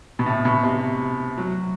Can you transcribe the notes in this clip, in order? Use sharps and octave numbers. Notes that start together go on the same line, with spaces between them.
B2
A2
B2
C3
F#3